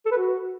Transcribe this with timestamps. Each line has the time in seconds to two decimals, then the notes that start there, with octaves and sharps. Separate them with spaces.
0.06 A4
0.11 B4
0.17 F#4